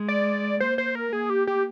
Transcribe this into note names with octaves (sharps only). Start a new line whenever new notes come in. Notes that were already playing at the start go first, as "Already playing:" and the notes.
Already playing: G#3
D5
A#3 C5
C5
A#4
A#3 G#4
G4
G4